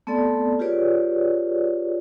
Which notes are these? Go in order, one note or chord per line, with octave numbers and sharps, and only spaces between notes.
A3 B3 C4 A4 D5
F4 G4 G#4 B4 C#5 D5